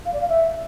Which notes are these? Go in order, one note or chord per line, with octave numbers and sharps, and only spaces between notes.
F5
D5
F5
E5